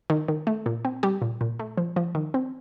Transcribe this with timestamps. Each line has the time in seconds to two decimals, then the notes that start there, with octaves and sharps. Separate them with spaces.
0.10 D#3
0.28 D#3
0.47 A3
0.66 A#2
0.85 C4
1.03 G3 G4
1.22 A#2
1.41 A#2
1.59 A3
1.78 F3
1.96 F3
2.15 D#3
2.34 C4